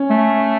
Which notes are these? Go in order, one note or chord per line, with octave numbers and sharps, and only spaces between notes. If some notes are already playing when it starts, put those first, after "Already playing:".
Already playing: C#4
A3